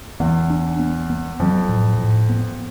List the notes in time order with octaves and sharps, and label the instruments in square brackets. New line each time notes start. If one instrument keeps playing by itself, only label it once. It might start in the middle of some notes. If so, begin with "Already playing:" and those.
[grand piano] E2 [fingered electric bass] B3
[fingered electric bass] D4
B3
B3
[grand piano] F2 [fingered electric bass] F#3
[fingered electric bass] A2
A2
B3